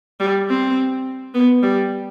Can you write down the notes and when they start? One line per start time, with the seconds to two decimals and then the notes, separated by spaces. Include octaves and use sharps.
0.20 G3
0.49 C4
1.34 B3
1.63 G3